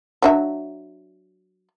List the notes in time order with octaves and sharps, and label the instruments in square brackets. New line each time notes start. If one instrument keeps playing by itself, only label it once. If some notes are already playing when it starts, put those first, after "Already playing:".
[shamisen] F#3 D4 E5